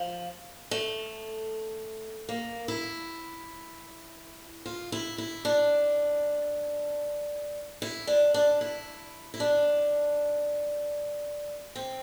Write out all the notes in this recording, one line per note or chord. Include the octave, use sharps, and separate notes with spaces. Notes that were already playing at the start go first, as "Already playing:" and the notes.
Already playing: F3
A3
A#3
E4
F4
E4
E4
D4
E4
D4
D4
E4
E4
D4
C4